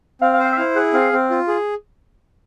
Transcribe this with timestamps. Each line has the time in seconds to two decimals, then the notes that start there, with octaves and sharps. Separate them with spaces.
0.21 C4 F5
0.34 F5
0.39 C5
0.45 F5
0.53 E5
0.57 E4 F5
0.75 G#4 F#5
0.93 C4 F5
1.13 C4
1.30 F4
1.48 G#4